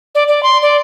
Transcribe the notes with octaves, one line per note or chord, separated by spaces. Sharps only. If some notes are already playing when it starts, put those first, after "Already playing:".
D5
D5
C6
D5